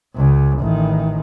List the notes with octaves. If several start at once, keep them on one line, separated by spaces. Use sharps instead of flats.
C#2 C#3
A1 D#3